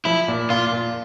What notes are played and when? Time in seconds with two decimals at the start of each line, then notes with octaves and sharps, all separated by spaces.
0.05 F3 E4
0.28 A#2
0.50 A#2 F4
0.73 A#2